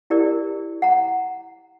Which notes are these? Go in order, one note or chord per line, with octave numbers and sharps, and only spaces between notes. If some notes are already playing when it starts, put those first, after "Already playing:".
E4 G4 A#4 D5
F#5 A#5